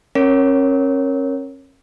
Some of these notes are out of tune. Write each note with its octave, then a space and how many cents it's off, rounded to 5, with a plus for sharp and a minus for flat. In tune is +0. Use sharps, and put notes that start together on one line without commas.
C#4 -35 A#4 +0 C#5 +0